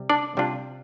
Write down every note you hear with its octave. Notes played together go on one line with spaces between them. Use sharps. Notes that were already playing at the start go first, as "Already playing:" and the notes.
Already playing: C3 G3
D4 D5
C3 G3 D4 F4